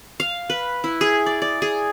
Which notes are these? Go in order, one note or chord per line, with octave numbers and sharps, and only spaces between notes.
F5
B4
E4
G#4
D5
D5
G#4